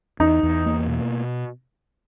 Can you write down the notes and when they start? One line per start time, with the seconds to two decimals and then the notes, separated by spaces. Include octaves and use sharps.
0.20 E2 D#4
0.43 E2
0.66 A#3
0.88 B2